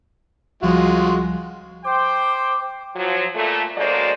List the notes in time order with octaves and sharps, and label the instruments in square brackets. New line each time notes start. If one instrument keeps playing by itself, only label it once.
[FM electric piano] C#2 F3 G3 [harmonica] G#3 F4 F#4
[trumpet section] C5 G5 [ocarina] D6
[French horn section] F3 F#3
A#2 A3
D2 F#3 G#3 A#3 C5 D5